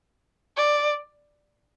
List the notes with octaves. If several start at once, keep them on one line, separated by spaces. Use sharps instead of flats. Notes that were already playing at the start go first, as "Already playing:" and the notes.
D5